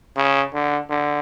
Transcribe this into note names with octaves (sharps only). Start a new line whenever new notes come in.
C#3
D3
D3